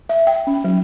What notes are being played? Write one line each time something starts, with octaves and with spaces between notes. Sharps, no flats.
E5
G5
C#4
F#3